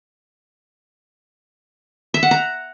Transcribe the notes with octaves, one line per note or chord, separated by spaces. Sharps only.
E5
F#5
A#5